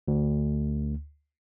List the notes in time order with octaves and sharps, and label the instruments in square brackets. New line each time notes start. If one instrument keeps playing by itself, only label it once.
[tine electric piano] D2